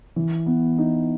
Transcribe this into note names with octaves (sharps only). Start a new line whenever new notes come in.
E3
B3
D#4